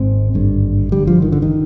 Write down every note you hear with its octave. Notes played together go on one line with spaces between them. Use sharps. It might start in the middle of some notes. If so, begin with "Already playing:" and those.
Already playing: G#1 G#2 C4
G#1 G2 D3
G1 G2 D3 G3
F3
D#3
D3
D#3